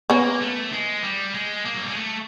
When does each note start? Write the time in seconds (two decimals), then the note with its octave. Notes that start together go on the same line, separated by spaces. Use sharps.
0.10 A#3 B3 C#4
0.42 A3
0.73 G#3
1.04 G3
1.35 G#3
1.66 A#3
1.74 F#3
1.81 G3
1.89 G#3
1.96 A3